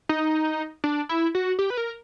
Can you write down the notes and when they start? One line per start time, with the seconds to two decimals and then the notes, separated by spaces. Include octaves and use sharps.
0.09 D#4
0.84 D4
1.09 E4
1.35 F#4
1.59 G4
1.70 B4
1.77 A#4